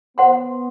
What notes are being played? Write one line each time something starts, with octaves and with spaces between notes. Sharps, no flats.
B3 C5 F#5 C6